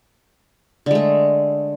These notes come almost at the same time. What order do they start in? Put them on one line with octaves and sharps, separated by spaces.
D3 G#3 A3